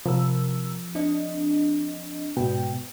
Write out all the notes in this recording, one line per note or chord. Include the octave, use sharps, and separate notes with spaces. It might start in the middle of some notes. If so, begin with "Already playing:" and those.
C3 F3 A#4 E6
C4 D4 D#5
G#2 B2 G5